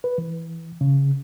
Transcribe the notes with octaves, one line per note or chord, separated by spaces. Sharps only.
B4
E3
C#3